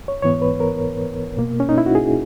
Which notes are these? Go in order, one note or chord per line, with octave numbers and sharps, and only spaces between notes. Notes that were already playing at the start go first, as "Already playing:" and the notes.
C#5
G#2 E3 B3 C#5
B4
A#4
B2 A#3
C#4
D#4
E4
F#4
G#4